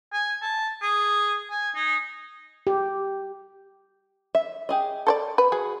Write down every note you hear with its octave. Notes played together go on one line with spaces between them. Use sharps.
G#5
A5
G#4
G#5
D#4
G4
E5
G4 G#4 D#5
A4 C5 D5
B4
F#4 G#4